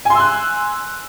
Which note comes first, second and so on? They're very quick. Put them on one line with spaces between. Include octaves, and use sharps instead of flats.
G#5 C6 E6 F#6